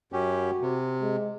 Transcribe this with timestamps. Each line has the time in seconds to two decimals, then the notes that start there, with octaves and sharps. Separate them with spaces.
0.13 F#2 C#4 F#4 G4
0.62 C3
1.02 G#3